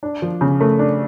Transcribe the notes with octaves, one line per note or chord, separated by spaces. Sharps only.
D4
F3
C#3
A3
D4